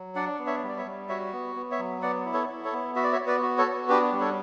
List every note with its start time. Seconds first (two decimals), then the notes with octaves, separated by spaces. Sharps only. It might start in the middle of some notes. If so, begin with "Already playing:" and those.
Already playing: F#3
0.15 D4 D5 F#5
0.39 B3
0.47 C#5 E5
0.63 G3
0.69 D5
0.78 C#5 E5
0.85 G3
1.09 F#4 C#5 E5
1.32 B3
1.56 B3
1.71 C#5 E5
1.79 F#3
2.02 B3 D5 F#5
2.25 E4
2.34 A4 C#5
2.49 E4
2.65 A4 C#5
2.73 B3
2.96 F#4 E5
3.04 D5
3.12 C#5 E5
3.19 B3
3.27 B4 D5
3.43 F#4
3.58 A4 C#5
3.66 B3
3.89 D4 G4 B4
4.12 G3
4.20 A4 C#5